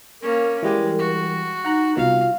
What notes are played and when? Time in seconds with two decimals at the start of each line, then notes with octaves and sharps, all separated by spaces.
0.22 A#3 C#4 A#4
0.63 E3 G3 G#3 G4
0.99 F#4
1.65 D#4 F#5 A#5 F#6
1.97 C2 B2 F4 F5